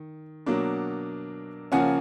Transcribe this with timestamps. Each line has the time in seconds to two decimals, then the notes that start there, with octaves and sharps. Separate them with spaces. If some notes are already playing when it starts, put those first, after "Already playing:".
Already playing: D#3
0.46 B2 F#3 A#3 D4
1.72 C#3 F3 A#3 C#4 F#5 G#5